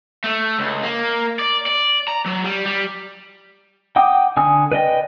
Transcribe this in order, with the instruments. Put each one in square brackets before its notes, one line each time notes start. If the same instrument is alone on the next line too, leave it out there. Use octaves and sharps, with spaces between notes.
[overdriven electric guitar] A3
C#2
A#3
D5
D5
A#5
F#3
G3
G3
[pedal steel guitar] F#5 G5 D6 D#6
D3 G#5 D#6
B4 D5 D#5 G5